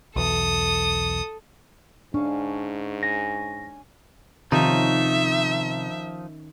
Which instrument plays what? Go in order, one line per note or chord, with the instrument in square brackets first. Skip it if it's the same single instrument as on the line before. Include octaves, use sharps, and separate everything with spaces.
[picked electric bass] B1 E2 [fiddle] A4 D#6
[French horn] G#2 [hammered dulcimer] C#4 F5 A5 [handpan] D4
[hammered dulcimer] G#5 [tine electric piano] A#6
[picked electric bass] C3 [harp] D#3 C#4 [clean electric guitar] F3 D#4 [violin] E5